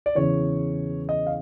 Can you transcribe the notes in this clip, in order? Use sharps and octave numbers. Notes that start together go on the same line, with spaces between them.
D5
E2 C#3 E3 C#5
D#5
F5